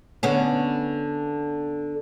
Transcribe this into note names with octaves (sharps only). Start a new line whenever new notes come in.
D3 B3 C#4